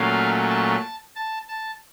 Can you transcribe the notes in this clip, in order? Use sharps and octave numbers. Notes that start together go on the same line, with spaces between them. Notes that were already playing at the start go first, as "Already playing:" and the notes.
Already playing: A#2 F#3 A3 C#4 F5
A5
A5
A5